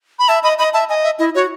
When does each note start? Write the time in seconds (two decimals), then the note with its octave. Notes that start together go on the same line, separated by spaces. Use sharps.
0.19 B5
0.28 E5 A5
0.43 D#5 B5
0.58 D#5 B5
0.73 E5 A5
0.89 D#5 G#5
1.03 E5
1.19 E4 D#5
1.35 F#4 C#5